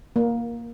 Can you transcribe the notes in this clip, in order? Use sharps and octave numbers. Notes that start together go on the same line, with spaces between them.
A#3